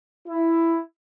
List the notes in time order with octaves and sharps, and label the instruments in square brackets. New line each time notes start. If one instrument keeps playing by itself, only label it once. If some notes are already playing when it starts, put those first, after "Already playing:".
[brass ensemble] E4